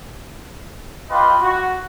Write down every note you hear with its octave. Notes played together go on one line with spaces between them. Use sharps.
F4 G4 B4 D#5 G5 C6
F#4